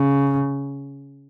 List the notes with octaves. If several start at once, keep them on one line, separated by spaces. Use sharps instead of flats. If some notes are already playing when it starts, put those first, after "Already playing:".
Already playing: C#3